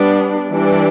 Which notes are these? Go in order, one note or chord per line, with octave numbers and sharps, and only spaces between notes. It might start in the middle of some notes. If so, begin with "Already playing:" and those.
Already playing: G3 B3 D4
E3 G3 D4